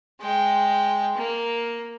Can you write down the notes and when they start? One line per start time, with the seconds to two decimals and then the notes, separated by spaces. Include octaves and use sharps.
0.21 G#3 G5
1.17 A#3